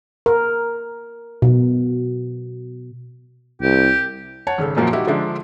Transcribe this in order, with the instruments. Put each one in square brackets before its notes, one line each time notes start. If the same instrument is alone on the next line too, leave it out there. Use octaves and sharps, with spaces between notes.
[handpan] A#4
B2
[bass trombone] C2 [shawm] G4
[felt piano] C#5 F#5 A5
G#1 C#3 A4
F#2 A#2 F3 A#3 F#4
G3 D#4 E4 F#4 G4
D3 F3 G#3 D4 E4